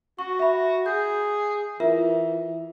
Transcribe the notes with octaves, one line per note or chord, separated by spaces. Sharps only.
F#4 C#6
E5 B5
G#4 G6
E3 F4 A#4 E5